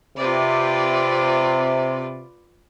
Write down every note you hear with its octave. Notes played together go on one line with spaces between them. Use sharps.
C3 F4 B4 D5